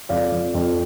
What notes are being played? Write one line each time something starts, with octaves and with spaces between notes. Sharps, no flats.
F2 D5 F5
F2
F2